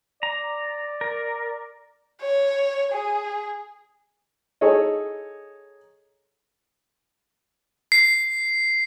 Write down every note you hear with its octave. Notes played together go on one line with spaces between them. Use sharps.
D5 A#5
A#4
C#5
G#4
D#4 G#4 A4 C#5 D#5
C7